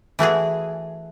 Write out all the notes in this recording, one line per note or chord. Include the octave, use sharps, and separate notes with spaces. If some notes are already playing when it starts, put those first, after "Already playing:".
E3 A3 F#4 G#4